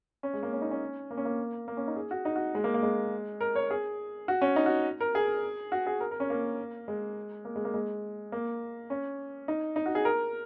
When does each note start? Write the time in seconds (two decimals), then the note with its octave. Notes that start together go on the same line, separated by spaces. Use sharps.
0.23 C#4
0.34 G#3
0.43 A#3
0.53 C#4
0.62 D#4
0.71 C#4
1.11 A#3
1.17 C#4
1.25 A#3
1.68 A#3
1.77 C#4
1.88 D#4
1.96 G#4
2.11 F#4
2.25 D#4
2.36 F#4
2.55 G#3
2.64 A#3
2.74 A#3
2.83 G#3
3.41 A#4
3.55 C#5
3.71 G#4
4.28 F#4
4.42 C#4
4.56 D#4
4.66 F#4
5.00 A#4
5.15 G#4
5.72 F#4
5.87 G#4
6.00 A#4
6.11 A#4
6.20 C#4
6.30 A#3
6.88 G#3
7.45 A#3
7.56 G#3
7.65 A#3
7.74 G#3
8.32 A#3
8.90 C#4
9.48 D#4
9.76 D#4
9.86 F#4
9.95 G#4
10.05 A#4